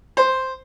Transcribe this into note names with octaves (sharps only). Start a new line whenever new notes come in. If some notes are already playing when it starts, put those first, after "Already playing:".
C5